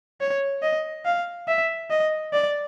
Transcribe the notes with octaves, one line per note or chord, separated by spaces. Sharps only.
C#5
D#5
F5
E5
D#5
D5